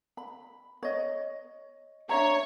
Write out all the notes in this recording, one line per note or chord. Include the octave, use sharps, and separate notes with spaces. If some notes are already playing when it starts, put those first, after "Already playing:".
B5
C#5 D#5
D4 C#5 E5 A#5